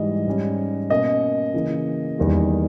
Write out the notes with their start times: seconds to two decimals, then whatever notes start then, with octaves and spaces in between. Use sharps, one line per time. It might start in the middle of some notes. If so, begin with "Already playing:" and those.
Already playing: G#2 E3 G3 D#5
0.27 G#2 G3 C#4
0.90 B2 A#3 C#4 D#5
1.54 C#3 E3 A#3
2.18 E2 D#3 G3 A#3